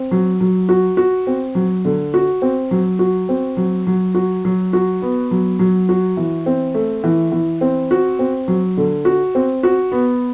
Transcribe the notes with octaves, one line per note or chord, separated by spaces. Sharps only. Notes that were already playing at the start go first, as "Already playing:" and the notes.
Already playing: C4
F#3
F#3
F#4
F#4
C4
F#3
D3
F#4
C4
F#3
F#4
C4
F#3
F#3
F#4
F#3
F#4
B3
F#3
F#3
F#4
E3
C4
A3
E3
E3
C4
F#4
C4
F#3
D3
F#4
C4
F#4
B3